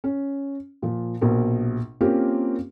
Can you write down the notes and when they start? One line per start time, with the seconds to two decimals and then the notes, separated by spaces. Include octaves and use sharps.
0.04 C#4
0.82 A#2 F3
1.21 A#1 B2 A#4
2.01 A#3 C4 C#4 F4 G4 A#4